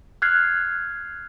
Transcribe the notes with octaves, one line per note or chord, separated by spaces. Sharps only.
F6 F#6 G#6 C7